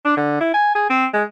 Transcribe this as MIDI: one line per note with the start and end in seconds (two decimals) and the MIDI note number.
0.05 0.17 62
0.17 0.39 50
0.40 0.51 64
0.54 0.75 80
0.75 0.88 68
0.90 1.06 60
1.14 1.23 56